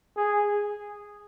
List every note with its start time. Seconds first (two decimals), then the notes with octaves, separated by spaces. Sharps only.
0.17 G#4